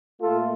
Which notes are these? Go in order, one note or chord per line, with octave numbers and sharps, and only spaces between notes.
A#2 A3 F4 A4